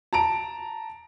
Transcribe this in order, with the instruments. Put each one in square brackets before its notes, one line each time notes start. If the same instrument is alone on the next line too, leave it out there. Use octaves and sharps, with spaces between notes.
[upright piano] A5 A#5 D7